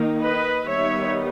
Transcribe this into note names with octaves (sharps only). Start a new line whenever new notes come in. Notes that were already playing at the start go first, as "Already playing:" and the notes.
Already playing: D#3 A#3 D#4
B4 D#5
D#3 G3 B3 D#4 C#5 E5